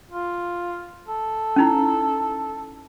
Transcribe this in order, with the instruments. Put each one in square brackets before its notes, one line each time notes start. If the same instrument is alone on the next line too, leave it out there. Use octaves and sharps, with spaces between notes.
[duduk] F4
A4
[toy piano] C#4 D#4 E4